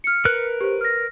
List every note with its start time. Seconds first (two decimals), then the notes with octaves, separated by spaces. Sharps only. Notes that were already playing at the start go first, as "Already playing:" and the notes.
0.04 F6 C#7
0.25 A#4 B4 F#6
0.61 G4 C5
0.81 F6 A#6